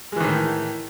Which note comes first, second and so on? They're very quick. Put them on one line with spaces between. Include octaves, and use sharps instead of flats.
G#3 E3 D#3 A2